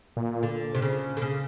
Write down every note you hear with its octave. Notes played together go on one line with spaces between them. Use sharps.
A#2
D3
C3
C#3
D3
C#3